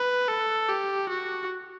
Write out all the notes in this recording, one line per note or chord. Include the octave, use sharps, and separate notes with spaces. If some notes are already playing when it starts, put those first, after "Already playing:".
Already playing: B4
A4
G4
F#4